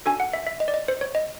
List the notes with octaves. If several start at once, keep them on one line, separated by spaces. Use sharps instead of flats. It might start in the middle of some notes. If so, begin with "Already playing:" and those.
D4 F#4 A4 G#5
F#5
E5
E5
D#5
D5
D#5
C5
C#5
D#5